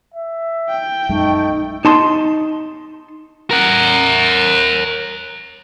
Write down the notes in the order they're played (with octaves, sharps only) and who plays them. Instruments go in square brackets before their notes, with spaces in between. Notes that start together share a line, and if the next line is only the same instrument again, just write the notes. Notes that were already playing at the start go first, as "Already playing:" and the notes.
[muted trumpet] E5
[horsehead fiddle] G5
[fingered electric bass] A#1 F#2 G#3 [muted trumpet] A3 [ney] D#4
[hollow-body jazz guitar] D#4 A5 C6
[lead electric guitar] A#4 F#5